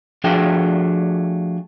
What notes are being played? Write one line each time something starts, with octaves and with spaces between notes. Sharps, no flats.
F3 A3 D4 F#4 G#4 G5